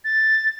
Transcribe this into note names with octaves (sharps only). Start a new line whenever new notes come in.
A6